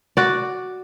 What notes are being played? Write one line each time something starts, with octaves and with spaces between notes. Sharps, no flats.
F#4 D5